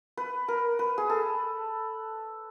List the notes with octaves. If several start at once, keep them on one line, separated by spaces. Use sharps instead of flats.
B4
A#4
B4
G#4
A4